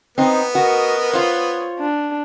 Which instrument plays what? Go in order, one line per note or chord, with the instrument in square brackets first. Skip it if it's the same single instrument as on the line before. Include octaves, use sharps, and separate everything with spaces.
[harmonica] B3 [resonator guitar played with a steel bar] C4 D#4
[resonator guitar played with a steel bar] F#4 [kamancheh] A#4 D#5
[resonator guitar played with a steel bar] F4 C5 [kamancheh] C#5
[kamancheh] D4